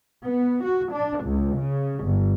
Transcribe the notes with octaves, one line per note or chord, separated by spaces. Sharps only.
B3
F#4
D4
C#2
C#3
G1